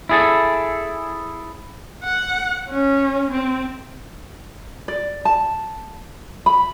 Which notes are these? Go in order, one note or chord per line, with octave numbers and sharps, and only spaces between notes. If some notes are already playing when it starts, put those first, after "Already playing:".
E4 G#4 A4
F#5
C#4
C4
D5
A5
B5